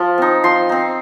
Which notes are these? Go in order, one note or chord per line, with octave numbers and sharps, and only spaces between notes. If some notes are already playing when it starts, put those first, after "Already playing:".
Already playing: F3
C4 D#4
F3 C6
C4 D#4